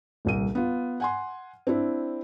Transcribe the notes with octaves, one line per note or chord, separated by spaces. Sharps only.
D#1 C2 D#7
B3 F4
F#5 G#5 C6
C4 D4 E4